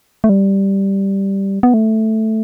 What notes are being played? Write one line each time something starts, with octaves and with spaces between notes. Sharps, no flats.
A3
G3
B3
A3